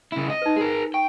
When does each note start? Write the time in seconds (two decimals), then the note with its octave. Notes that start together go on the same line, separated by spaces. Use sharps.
0.12 C#3 E4
0.30 D#5
0.42 D#4 B4
0.56 G#4 A#4
0.94 G5 C#6